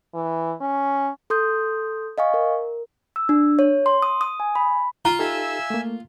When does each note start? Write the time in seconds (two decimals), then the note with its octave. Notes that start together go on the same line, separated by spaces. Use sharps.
0.14 E3
0.60 C#4
1.30 A4 C6 D#6 G6
2.18 D#5 F5 G#5 C#6
2.34 A#4
3.16 E6
3.29 D4
3.59 C#5
3.86 C6
4.02 D#6
4.21 D#6
4.40 G#5
4.55 B5
5.05 F4 A#5
5.19 D#4 G4 A4 E5 G#5 E6
5.70 A3 A#3